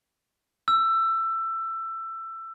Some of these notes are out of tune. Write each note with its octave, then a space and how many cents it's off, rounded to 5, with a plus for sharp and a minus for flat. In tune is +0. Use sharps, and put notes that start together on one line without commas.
E6 +20